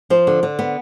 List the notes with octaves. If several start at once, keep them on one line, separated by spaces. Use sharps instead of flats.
F3 C5
D3
D3
B3